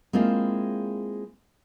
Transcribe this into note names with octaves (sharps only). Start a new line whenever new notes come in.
G#3 A#3 C4 E4 F4 G#4